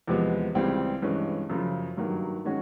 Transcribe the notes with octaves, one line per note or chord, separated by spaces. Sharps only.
E2 C3 F3 G#3 B3
C#2 C#3 E3 G3 C4
G2 E3 G#3 C#4
F#2 C#3 F3
G2 D#3 F#3 A#3
D#3 G#3 C#4 F#4